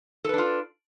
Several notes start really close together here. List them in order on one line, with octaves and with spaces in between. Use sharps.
A4 B4 D4 F4